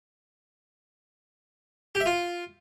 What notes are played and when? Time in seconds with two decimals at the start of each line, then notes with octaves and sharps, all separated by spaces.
1.95 G4
2.00 E5
2.06 F4